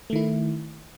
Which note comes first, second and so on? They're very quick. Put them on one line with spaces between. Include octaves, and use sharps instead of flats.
A3 D#3 E4